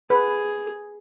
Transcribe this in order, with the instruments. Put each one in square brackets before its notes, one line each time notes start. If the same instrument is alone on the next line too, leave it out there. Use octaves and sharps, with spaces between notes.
[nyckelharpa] G#4 [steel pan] B4